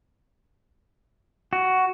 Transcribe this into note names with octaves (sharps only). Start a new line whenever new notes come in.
F#4